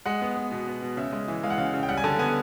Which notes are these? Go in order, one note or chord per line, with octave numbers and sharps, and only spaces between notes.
G#3 F#5
B3
B3
B2
B3
B2
C#3 E5
G#3
E3
G#3 F5
F#5
C#3 F5
C#3
G5
G3 F#5
G#5
D3 A5
B3 G#5